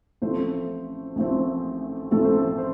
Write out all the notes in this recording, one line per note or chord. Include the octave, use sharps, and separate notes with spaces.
A1 A2 F3 A3 C4 C5
A1 A2 F3 A3 C4
A1 A2 F3 A3 C4 A4
C5
A4
C5